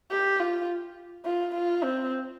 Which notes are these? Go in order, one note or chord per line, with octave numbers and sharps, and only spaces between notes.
G4
F4
F4
F4
C4